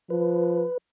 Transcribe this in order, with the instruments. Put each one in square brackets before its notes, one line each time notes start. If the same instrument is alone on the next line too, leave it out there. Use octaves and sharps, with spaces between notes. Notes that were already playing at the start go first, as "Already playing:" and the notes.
[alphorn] F3 [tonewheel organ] B4